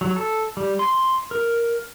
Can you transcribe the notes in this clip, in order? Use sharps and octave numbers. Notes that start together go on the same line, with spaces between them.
F#3
A4
G3
C6
A#4